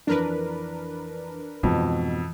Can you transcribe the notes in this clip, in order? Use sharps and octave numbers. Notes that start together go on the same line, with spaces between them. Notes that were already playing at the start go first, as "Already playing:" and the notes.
F2 E3 D4 A#4 B4
F2 G#2 B2 E3